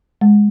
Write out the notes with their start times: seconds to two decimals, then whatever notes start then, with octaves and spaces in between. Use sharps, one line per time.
0.21 G#3